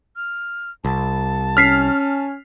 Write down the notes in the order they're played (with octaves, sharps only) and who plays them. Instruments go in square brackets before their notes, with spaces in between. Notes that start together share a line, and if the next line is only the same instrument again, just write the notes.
[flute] F6
[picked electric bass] C2 [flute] A5
[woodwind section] C#4 [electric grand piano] F6 B6 C7